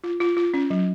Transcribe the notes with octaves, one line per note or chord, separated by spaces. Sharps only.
F4
F4
F4
C#4
F#3